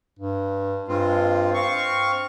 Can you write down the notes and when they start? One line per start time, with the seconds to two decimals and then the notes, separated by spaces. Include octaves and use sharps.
0.19 G2
0.88 G2 G#3 C4 F4
1.54 C4 F5 C#6